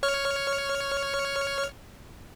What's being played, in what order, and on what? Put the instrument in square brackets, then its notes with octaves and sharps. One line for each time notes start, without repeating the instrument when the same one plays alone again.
[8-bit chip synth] C#5 C#6 F6